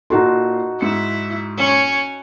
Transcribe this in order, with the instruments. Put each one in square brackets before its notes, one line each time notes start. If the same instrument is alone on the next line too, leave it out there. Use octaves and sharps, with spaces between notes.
[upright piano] A#2 C6 [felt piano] D#4 F#4 A4
[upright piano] G#2 C#7 [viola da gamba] E4
[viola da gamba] C#4 C#5